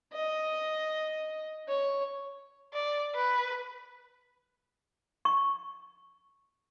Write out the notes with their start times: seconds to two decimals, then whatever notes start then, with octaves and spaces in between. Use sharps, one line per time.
0.13 D#5
1.68 C#5
2.74 D5
3.15 B4
5.25 C#6